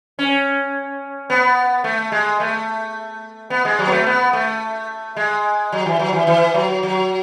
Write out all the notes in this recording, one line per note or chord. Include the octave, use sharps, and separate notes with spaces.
C#4
B3
A3
G#3
A3
B3
G#3
F#3
B3
A3
B3
A3
G#3
F#3
E3
F#3
E3
E3
F#3
F#3